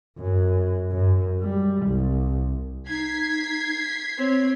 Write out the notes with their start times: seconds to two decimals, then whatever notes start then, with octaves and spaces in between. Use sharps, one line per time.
0.18 F#2
0.92 F#2
1.42 G3
1.86 C2
2.88 D#4 G#6 B6 C7
4.18 C4 C#5